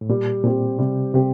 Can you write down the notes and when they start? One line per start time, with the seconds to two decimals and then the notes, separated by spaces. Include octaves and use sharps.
0.01 A2
0.09 A#2 G3
0.44 A#2 C4 G4
0.79 C3 G3
1.14 C3 C4 G4